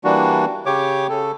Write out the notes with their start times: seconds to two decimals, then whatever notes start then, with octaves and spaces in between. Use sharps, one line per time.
0.04 E3 G3 A#3 D4 F#4
0.66 C#3 G4 C#5 D6
1.10 C#3 A4